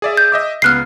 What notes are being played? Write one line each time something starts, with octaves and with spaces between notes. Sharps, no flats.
G#4 D5 E5
G6
D#5 E5 D6
C#2 B3 F6 F#6 C7